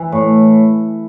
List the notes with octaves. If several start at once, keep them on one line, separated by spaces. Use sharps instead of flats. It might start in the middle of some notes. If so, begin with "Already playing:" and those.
Already playing: E3
A2